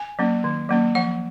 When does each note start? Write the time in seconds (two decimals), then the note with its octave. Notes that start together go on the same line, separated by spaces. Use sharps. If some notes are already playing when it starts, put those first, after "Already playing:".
Already playing: G#5
0.19 F#3 A#3 C#4
0.44 D#3
0.69 F#3 A#3 C#4
0.95 F3 F#5